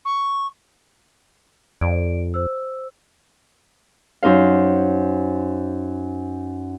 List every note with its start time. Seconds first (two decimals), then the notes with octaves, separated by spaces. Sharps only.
0.05 C#6
1.81 F2 D5 D7
2.34 C5 E6
4.22 F#2 D#4 C5 F5